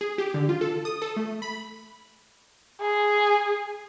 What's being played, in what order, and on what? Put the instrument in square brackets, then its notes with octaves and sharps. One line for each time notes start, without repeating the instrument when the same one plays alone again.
[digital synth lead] G#4
G4
D3
F4
A4
D#6
A4
A3
B5
[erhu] G#4